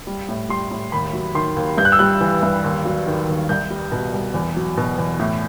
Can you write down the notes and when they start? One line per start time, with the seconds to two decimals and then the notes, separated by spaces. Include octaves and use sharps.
0.07 G3
0.29 A2
0.49 G3 C6
0.71 A2
0.92 D#2 B5
1.13 F#3
1.35 D#3 C6
1.56 D#2
1.78 G2 G6
1.85 F#6
1.92 E6
1.99 G3 F#6
2.21 E3
2.43 G2
2.64 D#2
2.85 F#3
3.07 D#3
3.28 D#2
3.49 C2 G6
3.70 G3
3.92 B2
4.13 C2
4.34 E2
4.56 F#3
4.77 B2
4.98 E2
5.19 A2